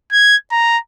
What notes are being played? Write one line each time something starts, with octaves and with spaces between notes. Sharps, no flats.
G#6
A#5